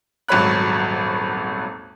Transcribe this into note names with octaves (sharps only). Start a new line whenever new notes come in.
D#1 G#1 F#3 C#5 B5 F#6